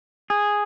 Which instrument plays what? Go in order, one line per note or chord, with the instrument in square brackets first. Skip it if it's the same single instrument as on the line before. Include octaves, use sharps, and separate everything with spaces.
[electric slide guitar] G#4